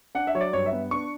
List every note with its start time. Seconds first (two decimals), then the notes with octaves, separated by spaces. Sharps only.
0.15 D4 F#5
0.27 E5
0.35 F#3 C#5
0.41 D5
0.53 G2 C#5
0.66 E5
0.72 B3
0.91 D4 C#6